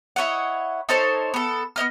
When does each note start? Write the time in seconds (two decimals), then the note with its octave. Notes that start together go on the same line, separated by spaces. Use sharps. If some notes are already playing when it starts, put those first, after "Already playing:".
0.16 E4 C#5 D#5 F#5
0.89 D#4 A4 C5 C#5
1.34 B3 A4
1.76 B3 C#5 D#5 F6